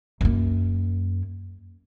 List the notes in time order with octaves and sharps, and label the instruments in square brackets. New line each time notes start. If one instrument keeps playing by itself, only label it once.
[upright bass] F#2 A#3